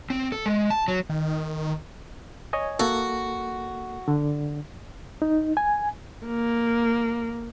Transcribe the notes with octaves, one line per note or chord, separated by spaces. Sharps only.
C4
A4
G#3
A5
F#3
D#3
C#5 D#5 G#5
A#3 F#4 A4
D3
D#4
G#5
A#3